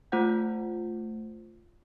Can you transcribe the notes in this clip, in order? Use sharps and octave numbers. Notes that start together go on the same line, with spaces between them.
A3 F4 C5 F#5 G6